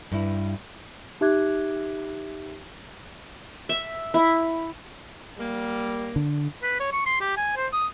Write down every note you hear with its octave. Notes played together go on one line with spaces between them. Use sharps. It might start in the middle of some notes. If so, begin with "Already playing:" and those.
G2 E4
D#4 G4 E5 D6 F#6 G#6
E5
E4
G3 A#3
D3
B4
C#5
C#6
C6
G4
G#5
C5
D#6